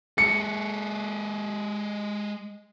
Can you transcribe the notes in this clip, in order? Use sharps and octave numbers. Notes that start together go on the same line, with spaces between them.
G#3 A4 C#7